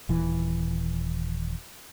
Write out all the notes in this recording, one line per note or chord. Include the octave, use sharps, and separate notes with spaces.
D#1 E3